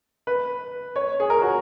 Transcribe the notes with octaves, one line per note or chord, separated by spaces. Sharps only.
B4
C#5
G#4
A#4
F#4